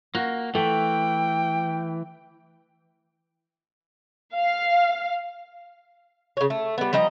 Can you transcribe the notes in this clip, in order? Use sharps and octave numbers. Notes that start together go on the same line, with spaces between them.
A#3 F#4
E3 A3 G5
F5
C#3 C#5
A3
G3 B3
F3 G3 D#5 A#5